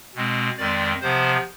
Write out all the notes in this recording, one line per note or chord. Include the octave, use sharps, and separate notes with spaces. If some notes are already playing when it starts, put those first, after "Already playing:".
B2 G#3 C4
F2 D#3 G#3 C4 D5
C3 F3 B3 C5